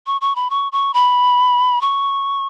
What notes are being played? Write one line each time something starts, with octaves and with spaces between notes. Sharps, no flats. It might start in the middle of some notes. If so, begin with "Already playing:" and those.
C#6
C#6
B5
C#6
C#6
B5
C#6